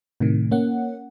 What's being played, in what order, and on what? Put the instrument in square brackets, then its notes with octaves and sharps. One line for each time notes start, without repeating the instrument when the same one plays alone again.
[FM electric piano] A2 C3 D#3
A#3 C#4 F#5